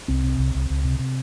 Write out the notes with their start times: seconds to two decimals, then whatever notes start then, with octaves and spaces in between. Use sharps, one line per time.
0.08 C2 C4
0.24 C3
0.39 C2
0.55 C2
0.70 C#2
0.85 C3
0.99 C3